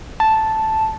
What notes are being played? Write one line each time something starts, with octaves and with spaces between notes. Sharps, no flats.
A5